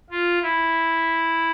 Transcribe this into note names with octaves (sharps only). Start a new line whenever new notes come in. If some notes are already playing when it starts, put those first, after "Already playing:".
F4
E4